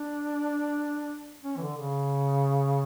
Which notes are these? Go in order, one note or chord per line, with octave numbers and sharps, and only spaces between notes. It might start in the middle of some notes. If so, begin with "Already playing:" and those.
Already playing: D4
C#4
E3
D3
C#3